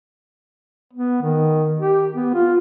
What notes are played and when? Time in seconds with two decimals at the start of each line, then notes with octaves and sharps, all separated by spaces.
0.93 B3
1.22 D#3
1.79 G4
2.14 B3
2.34 F4